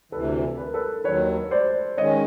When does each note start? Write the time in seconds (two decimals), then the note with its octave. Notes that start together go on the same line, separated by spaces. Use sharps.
0.12 D2 C3 E3 A4 B4
0.58 B4
0.66 A#4
0.74 A4 B4
1.04 D#2 D#3 F#3 B4 C#5
1.51 C5 D5
1.97 D#3 G#3 C#4 C#5 D#5